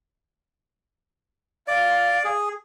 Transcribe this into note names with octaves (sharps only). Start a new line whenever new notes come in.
D5 F5
G#4